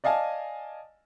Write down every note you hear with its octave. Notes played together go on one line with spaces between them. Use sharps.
D5 D#5 F5 G#5 A5